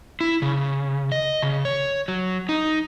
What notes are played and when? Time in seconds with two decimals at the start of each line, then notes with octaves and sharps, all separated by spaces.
0.21 E4
0.42 C#3
1.12 D#5
1.42 C#3
1.65 C#5
2.08 F#3
2.49 D#4